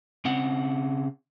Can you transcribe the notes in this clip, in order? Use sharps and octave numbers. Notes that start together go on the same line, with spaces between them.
C#3 C4 F#5